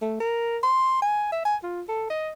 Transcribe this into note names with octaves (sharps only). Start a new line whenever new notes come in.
A3
A#4
C6
G#5
E5
G#5
F4
A4
D#5